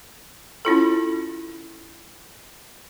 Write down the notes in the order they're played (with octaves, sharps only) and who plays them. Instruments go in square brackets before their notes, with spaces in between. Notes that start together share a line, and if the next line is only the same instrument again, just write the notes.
[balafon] C#4 E4 F4 A4